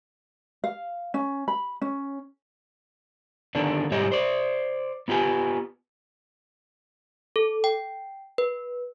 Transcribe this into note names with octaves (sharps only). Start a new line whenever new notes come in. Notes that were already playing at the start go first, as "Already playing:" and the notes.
F5
C#4
B5
C#4
D3 D#3 B3 D4
G#2 G3 G4 C#5 D#5
C5 D5
B3 F4 G4 B4 G#5
A4
G5
B4